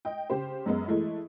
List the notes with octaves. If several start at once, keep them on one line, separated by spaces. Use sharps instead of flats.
D#5 G5
C#3 G4 C5
F#2 G#3 B3
E3 G#3 A3 E4